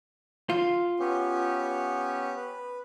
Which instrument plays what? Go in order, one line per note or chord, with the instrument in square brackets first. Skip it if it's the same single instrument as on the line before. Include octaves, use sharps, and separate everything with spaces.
[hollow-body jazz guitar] F4
[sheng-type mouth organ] B3 C#4 G4
B4